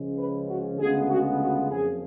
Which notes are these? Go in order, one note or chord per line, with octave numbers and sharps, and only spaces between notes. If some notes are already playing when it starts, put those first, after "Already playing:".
Already playing: C#2 C#3 F3 G#3 C#4
B4
F#4
D2 C#3 G#3 B3 F4 G#4
F#4
F#4
F#1 F2 C#3 F3 G#4